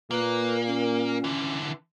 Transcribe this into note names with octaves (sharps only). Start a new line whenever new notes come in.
A#2 A#3 B4
C#4
D3 E3